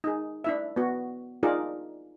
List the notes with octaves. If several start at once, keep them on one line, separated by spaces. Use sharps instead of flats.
D#4 G#4
D4 E4 E5
B3 F#4
D4 D#4 F4 G#4 A#4 D5